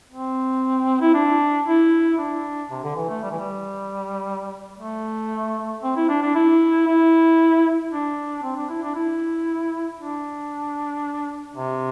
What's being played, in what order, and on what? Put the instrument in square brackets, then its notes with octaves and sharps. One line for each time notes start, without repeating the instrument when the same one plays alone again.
[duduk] C4
E4
D4
E4
D4
C3
D3
E3
A3
G3
E3
G3
A3
C4
E4
D4
D4
E4
E4
D4
C4
D4
E4
D4
E4
D4
C3